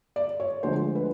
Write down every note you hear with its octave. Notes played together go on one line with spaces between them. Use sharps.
D5
C#5
D2 D3 F3 G#3 C5
B4